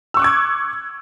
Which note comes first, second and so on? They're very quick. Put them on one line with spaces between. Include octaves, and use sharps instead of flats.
E6 C#6 F#6 D6 G#6